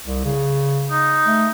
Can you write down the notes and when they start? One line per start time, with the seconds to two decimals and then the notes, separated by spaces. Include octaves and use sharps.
0.06 C2
0.25 C#3
0.91 D#4
1.26 A3